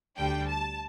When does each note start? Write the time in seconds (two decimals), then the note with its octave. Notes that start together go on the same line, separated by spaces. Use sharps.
0.17 D2 D3 G3 D4 G5
0.48 A5